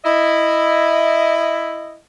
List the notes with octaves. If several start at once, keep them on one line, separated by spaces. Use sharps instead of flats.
E4 D#5